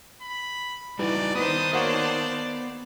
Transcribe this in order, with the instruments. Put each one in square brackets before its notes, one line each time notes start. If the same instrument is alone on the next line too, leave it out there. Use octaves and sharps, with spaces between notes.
[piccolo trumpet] B5
[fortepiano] E3 [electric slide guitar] G3 D#4 F#4 [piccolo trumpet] D5
[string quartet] D#3 C5 A5 [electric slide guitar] B3 [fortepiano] B4 [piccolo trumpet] D#6
[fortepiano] A#3 F#4 C#5 [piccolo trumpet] D5